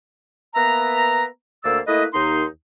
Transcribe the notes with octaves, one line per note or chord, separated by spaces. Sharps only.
A#3 B3 B4 E5 A#5
D2 A#3 C5 D5 E6
A3 A#3 E4 B4 D#5
D#2 D#4 C6